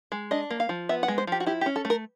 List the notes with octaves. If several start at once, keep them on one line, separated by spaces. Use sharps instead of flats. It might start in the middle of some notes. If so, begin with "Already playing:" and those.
G#3
D4 D#5
A#3
F5
F3
B3 E5
F#5
G#3
C5
F3 G4
F#4
E4 G4
G4
C#4
A4
A3
A#4